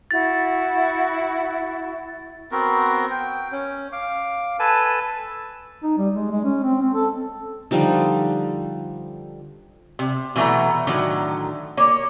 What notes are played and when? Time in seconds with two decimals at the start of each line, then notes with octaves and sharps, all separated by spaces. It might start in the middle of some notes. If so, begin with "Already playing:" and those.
0.11 E4 F#4 A6
2.52 B3 C4 F#4 A#4
3.11 G5
3.52 C#4
3.92 F5 D6
4.59 A4 B4 G#5 A5
5.83 D#4
5.98 G3
6.14 G#3
6.31 G#3
6.44 C#4
6.63 C4
6.82 C4
6.94 A4
7.71 D3 F3 G3 D#4
9.99 C3
10.36 B2 E3 F#3 A3 F#5 A#5
10.87 A2 D3 D#3 F#3
11.77 A#3 C#5